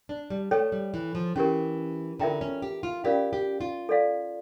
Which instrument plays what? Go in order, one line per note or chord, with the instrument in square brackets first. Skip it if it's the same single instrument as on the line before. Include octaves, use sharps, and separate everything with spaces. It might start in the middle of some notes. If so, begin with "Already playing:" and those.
[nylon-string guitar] D4
G3
[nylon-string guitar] A3 [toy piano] A4 C#5 G5
[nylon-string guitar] G3
E3
F3
[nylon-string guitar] E3 [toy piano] C#4 G4 A#4
[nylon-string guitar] D3 [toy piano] F4 A#4 E5 G5 A#5
[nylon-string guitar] C#4
G4
F4
[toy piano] C#4 F4 A#4 D5 F5 [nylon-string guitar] G4
[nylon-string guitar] G4
F4
[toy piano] A4 D5 F5